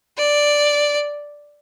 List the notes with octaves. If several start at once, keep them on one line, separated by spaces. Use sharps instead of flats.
D5